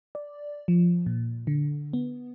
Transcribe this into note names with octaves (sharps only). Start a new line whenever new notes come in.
D5
F3
A#2
D3
B3